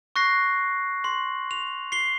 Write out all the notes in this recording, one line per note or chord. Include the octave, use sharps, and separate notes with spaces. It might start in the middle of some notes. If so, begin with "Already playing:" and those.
C#6 F#6 A#6 C7
C6 F#7
F7
C7 G7